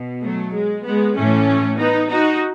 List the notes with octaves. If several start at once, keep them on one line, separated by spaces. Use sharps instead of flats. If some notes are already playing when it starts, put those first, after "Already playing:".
Already playing: B2
F#3 A3
G#3
G#3 B3
A2 E3 A3 C#4
B3 D#4
D#4 F#4